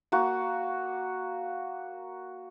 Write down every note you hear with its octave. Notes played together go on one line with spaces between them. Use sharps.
A#3 F#4